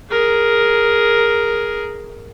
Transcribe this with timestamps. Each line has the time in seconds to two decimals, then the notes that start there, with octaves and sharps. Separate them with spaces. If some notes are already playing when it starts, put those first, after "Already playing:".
0.11 G#4 A#4